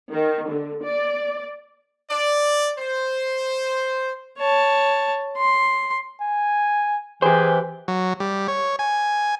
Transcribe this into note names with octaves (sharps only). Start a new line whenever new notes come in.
D#3
D3
D5
D5
C5
C#5 A5
C6
G#5
E3 G4 G#4 C5
F#3
G3
C#5
G#5